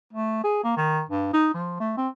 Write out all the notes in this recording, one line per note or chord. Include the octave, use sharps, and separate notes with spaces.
A3
G#4
A#3
D#3
G2
D#4
F3
A3
C4